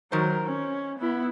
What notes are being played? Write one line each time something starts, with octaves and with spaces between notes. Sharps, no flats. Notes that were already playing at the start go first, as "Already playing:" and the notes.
D#3 F#3 A#4 C5
C#4
B3 E4